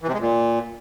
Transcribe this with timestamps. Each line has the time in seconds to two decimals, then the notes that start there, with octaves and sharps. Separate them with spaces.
0.02 E3
0.08 C3
0.14 G#3
0.20 A#2